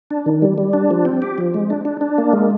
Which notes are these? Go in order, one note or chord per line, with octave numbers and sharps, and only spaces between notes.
D4
D#3
G3
G3
D4
F3
C4
G4
F3
G#3
D4
D4
D4
A#3
G#3